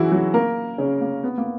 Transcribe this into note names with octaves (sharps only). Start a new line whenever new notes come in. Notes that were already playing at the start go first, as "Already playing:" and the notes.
Already playing: E3 F#3 E4 F#4 G#4
F#3 F#4
A#3 A#4
C#3 C#4
A#3
B3
A#3